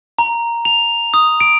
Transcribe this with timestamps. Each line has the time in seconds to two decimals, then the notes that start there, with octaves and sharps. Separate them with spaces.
0.19 A#5
0.65 F7
1.14 D#6
1.40 D7